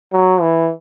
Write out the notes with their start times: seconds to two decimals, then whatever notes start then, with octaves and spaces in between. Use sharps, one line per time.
0.13 F#3
0.41 E3